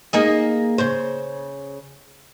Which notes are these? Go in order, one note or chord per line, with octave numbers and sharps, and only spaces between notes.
A#3 D#4 G#4
C#3 C5